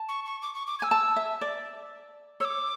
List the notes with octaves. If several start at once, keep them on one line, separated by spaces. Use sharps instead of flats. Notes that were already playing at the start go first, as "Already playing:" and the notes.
Already playing: A5
C#6
C#6
D6
C#6
D6
G#6
G#5 E6
A5
E5
D5
C#5 D6 E6